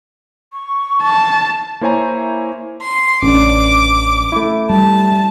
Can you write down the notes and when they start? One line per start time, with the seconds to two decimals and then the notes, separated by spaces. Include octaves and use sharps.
0.53 C#6
1.02 A5
1.81 A#3 E4 C5 C#5 G#5 A#5
2.82 C6
3.23 A1 C#4 D4 D6
4.32 A3 E4
4.70 G3 A5